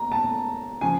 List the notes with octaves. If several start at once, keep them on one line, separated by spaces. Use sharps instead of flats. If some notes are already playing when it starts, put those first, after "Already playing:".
Already playing: A#5
A5
C#3 F3 G#5